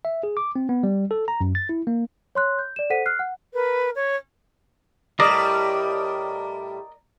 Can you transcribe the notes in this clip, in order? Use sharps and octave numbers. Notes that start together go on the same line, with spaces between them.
E5
G#4
D6
C4
B3
G3
A4
A#5
F#2
A6
E4
A#3
C#5 C6 F#6
G6
D5 E7
A4 C5 F#5 B6 D#7
F6 F#6 C7
F#5
A#4 B4
C#5
A2 G3 A#4 D5 D#5